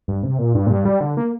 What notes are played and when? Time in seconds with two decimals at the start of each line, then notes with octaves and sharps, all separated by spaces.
0.08 G2
0.23 C3
0.39 A#2
0.55 G2
0.67 A#2
0.70 G2
0.85 G3
1.01 D3
1.17 A#3